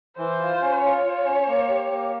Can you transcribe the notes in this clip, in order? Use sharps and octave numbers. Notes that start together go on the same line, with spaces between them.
E3 C5
F4
C#4
F4 C#5
F4
C#4
A#3
G4
A#3